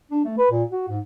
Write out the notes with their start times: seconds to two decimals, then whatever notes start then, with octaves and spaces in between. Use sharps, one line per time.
0.11 D4
0.24 A3
0.38 B4
0.51 A#2
0.71 F#4
0.88 G#2